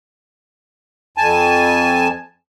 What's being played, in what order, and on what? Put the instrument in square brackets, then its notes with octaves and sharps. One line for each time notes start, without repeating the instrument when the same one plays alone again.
[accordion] F2 G#5 A5